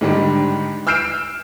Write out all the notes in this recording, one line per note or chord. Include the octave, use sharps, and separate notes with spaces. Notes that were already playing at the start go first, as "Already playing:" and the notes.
G#2 D3 D#3 G3
E6 F6 G6 C7 D7 E7